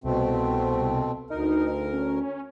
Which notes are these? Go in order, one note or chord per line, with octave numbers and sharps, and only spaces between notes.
C2 B2 A3 C4
D2 D#4 A#4
C#4